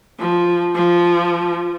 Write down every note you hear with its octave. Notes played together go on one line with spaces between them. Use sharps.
F3
F3